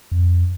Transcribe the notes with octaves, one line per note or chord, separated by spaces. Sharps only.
F2